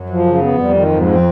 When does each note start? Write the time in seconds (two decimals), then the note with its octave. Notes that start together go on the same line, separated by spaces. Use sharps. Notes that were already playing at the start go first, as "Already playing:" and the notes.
Already playing: F#2 F#3
0.09 F3
0.26 C#3
0.42 B3
0.58 F2 F3 G3
0.74 D#3
0.91 G#2
1.08 C4